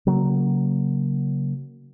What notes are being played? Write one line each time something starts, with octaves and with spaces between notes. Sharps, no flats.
C#3 F#3 A#3